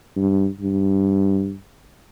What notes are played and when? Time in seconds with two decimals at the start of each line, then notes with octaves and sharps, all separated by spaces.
0.16 G2
0.61 G2